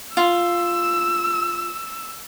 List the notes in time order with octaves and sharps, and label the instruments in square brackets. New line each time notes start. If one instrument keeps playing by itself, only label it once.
[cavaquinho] F4 [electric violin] E6